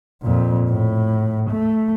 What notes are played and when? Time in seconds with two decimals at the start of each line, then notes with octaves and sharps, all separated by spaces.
0.22 F2 A#2
0.69 A2
1.50 A3